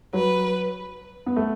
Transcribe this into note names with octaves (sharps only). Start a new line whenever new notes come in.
F#3 B4
B3
A3